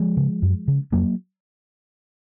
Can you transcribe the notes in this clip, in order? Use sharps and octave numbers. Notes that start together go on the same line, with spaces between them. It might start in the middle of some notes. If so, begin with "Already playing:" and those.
Already playing: F3 G#3
C#3
F#2
C#3
F2 F#3 A#3